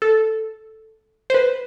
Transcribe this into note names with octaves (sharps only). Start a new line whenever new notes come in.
A4
C5
B4